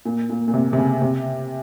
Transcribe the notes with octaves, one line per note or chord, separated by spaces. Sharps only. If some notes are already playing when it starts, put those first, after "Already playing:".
A#2
A#2
A#2
C3
C3
C#3
C3